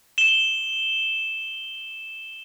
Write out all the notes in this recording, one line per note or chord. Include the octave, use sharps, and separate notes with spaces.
E7 G7